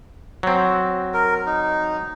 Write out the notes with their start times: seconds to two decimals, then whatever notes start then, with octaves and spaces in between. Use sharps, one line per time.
0.43 F#3 C4
1.14 A#4
1.46 D#4